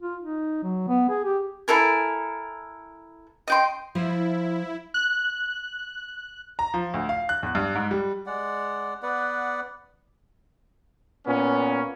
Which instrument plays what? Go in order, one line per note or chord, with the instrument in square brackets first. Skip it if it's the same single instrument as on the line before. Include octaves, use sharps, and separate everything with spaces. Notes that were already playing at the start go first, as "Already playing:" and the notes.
[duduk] F4
D#4
F#3
B3
G#4
G4
[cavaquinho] E4 A4 A#4 G#5
D#5 G5 C6
[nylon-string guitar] F3 C5 [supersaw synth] E4
[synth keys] F#6
[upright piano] A#5
F3
D2
F5
F#6
E2
G2
G#2
G3
[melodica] G#3 D5 F#5
B3 B4 D5 F#5
[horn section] A#2 B3 C#4